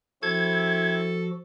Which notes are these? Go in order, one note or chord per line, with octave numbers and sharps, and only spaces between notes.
F3 C4 E4 F#4 A4 G#6